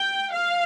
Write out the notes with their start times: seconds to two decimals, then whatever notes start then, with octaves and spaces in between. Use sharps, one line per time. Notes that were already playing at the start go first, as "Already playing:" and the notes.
Already playing: G5
0.32 F5